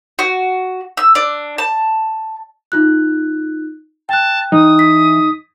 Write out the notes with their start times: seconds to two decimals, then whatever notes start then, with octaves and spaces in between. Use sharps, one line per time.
0.19 F#4
0.97 E6
1.15 D4
1.58 A5
2.72 D#4 F4 F#6
4.09 G5 A5 F#6
4.52 E3 D#4 D#6
4.79 B6